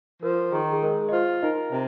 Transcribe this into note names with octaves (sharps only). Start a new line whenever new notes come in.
F3 A#4
D#3 G#4
G#4
G#3 A#4
D#5
F4 C5
D#4 A#4 D#5
C3 C5